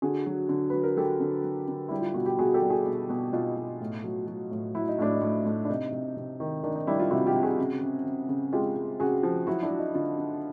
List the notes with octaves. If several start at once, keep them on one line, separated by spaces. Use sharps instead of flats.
D3 F#4 G#4
F#3
D3
F#3 B4
A#4
F#3 G4 A4
D3
F#3
D3
G3 E4
F4
B2 F#4
G4
B2 F#4 G#4
G4 A4
G3
F#4 G#4
B2
B2
B2 D#4 F4
B2
A2
F#3
F#3
A2
F#3 E4
D#4
A2 D4
D#4
A2
A2
D4
C3 D#4
C3
C3
D#3
D#3 D4
D#4
G3 D4 E4
D#4 F4
C3 E4 F#4
F4 G4
C3
F#4 G#4
C#3
C#3
C#3
C#3
G#3 F4 G4
G#3
C#3 F#4 G#4
F3
F#3 E4 F#4
D4 E4
F#3
D#4
D3 D#4 F4
D3